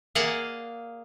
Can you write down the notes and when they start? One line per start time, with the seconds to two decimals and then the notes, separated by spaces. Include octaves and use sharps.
0.15 A#3 G#4 D5 D#5 F5 F#5